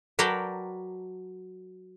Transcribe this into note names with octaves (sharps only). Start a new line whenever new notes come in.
F#3 A#4 B4 D5 G5 A5